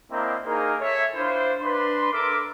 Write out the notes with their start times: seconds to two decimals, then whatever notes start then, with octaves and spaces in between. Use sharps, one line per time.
0.11 A#3 C4 D4 E4 A#4 D#5
0.45 A#3 D#4 G#4 A#4
0.80 A4 C#5 E5
1.14 D4 E4 F4 C5
1.61 D4 B4 C6
2.12 A4 A#4 E5 D6